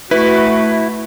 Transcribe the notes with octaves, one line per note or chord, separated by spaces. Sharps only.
A3 E4 F#4 B4